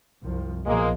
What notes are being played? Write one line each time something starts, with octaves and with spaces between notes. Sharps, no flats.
C2 F#2 F3
B1 A#2 F3 G#3 A#3